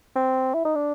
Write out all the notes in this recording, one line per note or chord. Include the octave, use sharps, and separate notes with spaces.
C4
E4
D#4
D4